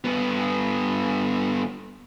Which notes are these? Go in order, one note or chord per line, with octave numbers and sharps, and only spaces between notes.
G2 B3